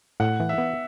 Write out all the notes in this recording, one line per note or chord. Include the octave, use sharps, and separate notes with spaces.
A2 F#5
E3
E5
B3